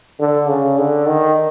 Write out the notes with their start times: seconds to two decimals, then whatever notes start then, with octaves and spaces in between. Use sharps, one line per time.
0.20 D3
0.48 C#3
0.78 D3
1.07 D#3